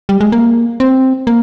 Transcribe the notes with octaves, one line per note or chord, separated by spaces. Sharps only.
G3
G#3
A#3
C4
A#3